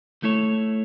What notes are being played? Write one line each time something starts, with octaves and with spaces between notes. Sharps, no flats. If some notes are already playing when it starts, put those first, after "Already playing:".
A3 E4 A4 C#5